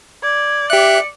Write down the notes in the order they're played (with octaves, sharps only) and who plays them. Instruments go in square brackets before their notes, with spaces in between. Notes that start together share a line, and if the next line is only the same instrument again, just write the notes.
[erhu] D5 [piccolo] G#6
[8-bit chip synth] G4 F#6 [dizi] E5 [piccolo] C#7